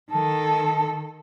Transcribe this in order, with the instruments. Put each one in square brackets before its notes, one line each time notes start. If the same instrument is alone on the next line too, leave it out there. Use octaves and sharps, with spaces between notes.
[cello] D#3 A4 [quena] A5